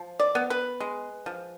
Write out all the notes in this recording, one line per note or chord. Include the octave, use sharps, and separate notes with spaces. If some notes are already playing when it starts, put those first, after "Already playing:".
Already playing: F3
D5
B3
B4
G#3
F3